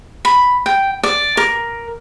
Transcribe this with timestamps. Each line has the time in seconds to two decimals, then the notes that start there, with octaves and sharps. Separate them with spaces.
0.25 B5
0.66 G5
1.03 D5
1.37 A#4